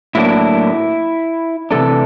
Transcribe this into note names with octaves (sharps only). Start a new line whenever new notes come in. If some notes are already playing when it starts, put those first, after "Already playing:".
A2 F#3 A#3 D4 E4
C3 E3 A3 D4 A4